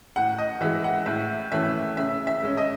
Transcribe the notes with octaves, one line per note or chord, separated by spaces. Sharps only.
A2 F#5
D#5
E3 G#3 E5
F#5
A2 E5
E3 A3 C#4 E5
C#3 E5
E5
G#3 C#4
D#5